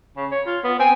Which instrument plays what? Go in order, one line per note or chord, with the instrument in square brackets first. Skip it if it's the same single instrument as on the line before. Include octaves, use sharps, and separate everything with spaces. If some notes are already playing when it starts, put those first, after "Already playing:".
[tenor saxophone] C#3
C#5
F4
B3
[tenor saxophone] C4 [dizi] G#5